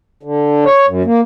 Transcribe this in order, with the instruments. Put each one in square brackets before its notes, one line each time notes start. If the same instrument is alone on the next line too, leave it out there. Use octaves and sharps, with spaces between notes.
[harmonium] D3
C#5
F#2
A#3